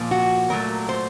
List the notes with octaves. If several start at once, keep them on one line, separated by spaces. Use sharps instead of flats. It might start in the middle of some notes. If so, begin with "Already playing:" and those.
Already playing: A#2 F3 A#3
F#4
A#2 F#3 A3 A#4
C5